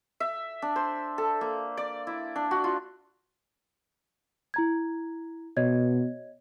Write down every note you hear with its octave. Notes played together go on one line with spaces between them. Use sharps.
E5
D4
C5
A4
A#3
D5
E4
D4
F#4
F4
E4 A#5 G#6
B2 C#5 D#5 G#6